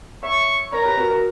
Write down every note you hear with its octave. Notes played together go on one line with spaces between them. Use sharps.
C#5 E5 C#6
A#4 C#5 A#5
G4 B4
F#4 A#4
F#4 A#4